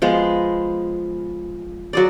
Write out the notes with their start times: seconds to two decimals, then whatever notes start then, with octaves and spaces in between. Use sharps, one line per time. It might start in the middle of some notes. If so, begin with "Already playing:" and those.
0.02 F3 G#3 B3
1.93 F#3 G#4 D5